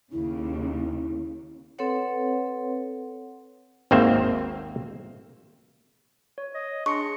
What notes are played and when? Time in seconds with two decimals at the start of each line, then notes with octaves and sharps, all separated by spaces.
0.12 D#2 C#3 E4
1.79 C4 A4 B4 C#5 F#5
3.91 G#1 D#2 A#3 C4 C5 E5
6.38 C#5
6.55 D#5
6.86 D4 G#4 C6 C#6 C#7